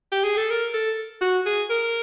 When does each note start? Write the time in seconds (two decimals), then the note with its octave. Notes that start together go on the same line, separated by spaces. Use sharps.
0.12 G4
0.24 G#4
0.37 A4
0.50 A#4
0.74 A4
1.21 F#4
1.46 G#4
1.70 A#4